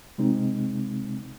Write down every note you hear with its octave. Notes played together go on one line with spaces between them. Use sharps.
C3 G#3 C4 D#4